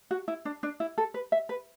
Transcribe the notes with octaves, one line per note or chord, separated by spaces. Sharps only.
F#4
E4
D4
D4
E4
A4
B4
E5
B4